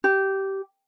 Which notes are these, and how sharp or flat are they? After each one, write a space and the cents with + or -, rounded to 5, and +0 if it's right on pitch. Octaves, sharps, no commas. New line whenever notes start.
G4 -15